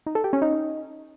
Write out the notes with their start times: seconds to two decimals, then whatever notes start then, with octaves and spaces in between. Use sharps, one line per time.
0.06 D#4
0.15 A4
0.24 G4
0.33 C#4
0.42 D#4